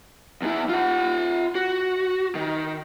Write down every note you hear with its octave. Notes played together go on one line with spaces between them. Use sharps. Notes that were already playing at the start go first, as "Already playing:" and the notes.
E2 E4
F4 F#5
F#4
D#3